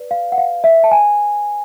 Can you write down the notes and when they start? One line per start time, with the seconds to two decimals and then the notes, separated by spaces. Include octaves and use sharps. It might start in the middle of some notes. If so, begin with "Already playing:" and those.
Already playing: B4 D5
0.11 F5
0.32 F#5
0.38 F5
0.64 E5
0.84 A5
0.91 G#5